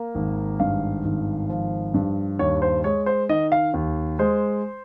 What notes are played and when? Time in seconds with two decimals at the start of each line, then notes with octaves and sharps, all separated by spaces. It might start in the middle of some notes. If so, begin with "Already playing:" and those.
Already playing: A#3
0.15 G#1
0.60 G2 F5
1.05 G#1
1.49 F3
1.94 G2
2.39 D#2 C#5
2.62 C5
2.84 G#3 C#5
3.06 C5
3.29 D#3 D#5
3.52 F5
3.74 D#2
4.19 G#3 C5